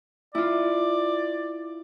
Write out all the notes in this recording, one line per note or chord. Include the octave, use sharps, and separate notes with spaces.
E4 F4 D5